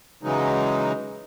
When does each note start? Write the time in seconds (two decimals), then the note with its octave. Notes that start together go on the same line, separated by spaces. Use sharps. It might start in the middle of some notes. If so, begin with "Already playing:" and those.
0.23 C#3 E3 F#3 G#3 D#4